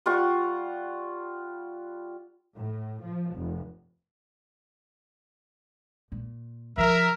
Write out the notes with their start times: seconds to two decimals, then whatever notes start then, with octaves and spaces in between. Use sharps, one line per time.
0.06 G3 F4 F#5 C#6
2.56 A2
3.04 F3
3.34 F1
6.12 A#2
6.77 C#3 F3 A#4 E5